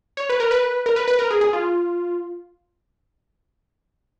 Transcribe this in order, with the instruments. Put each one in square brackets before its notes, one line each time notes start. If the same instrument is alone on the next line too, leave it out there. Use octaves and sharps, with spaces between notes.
[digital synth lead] C#5
B4
A#4
B4
A#4
B4
B4
A#4
G#4
G#4
F4